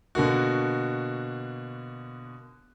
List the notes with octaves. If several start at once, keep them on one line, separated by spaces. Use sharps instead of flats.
B2 D3 A#3 F#4